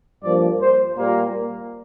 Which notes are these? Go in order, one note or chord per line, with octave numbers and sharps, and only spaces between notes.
G2 F3 A#3 D5
C5
A#2 G3 A#3